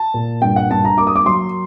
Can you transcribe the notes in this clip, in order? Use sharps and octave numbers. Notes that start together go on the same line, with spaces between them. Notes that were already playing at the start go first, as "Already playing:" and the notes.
Already playing: A5
A#2
G2 G5
F#5
G2 A5
A#5
A#3 D6
D#6
D6
F#3 C6